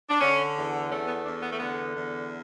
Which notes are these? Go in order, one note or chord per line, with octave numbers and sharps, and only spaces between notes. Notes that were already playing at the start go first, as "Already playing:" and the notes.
D4
D3 C#4
E2
A3 C#4
B3
E2 D4
B3
A3
D3 B3
E2